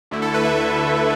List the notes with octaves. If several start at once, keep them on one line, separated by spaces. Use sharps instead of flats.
D2 D3 A3 E4
A4
B4
E5
B4